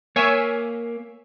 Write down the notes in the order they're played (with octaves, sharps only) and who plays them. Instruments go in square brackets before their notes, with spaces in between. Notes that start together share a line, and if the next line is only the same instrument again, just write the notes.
[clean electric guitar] A#3 [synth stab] C#5 E5 G#5